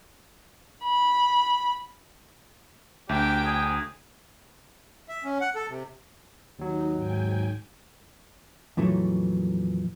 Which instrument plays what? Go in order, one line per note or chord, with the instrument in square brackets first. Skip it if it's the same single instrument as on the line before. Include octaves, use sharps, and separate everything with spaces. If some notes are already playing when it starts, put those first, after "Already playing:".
[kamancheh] B5
[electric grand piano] D2 E5 [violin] D4 G5 [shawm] G4
[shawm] G#4
[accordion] E5
C#4
F#5
A4
C3
[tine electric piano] D#2 F#3 [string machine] D#4
[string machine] G#2 G5 G#5
[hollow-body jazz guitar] F2 A#2 E3 F#3 A3